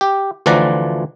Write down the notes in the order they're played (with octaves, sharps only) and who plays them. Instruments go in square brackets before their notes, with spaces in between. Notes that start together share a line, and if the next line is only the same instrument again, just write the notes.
[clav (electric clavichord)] G4
D2 E3 F3 D5 F#5 A#5